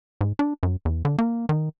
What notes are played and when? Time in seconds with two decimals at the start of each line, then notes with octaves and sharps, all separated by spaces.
0.21 G#2
0.39 D4
0.63 F#2
0.85 E2
1.05 D3
1.18 A#3
1.49 D#3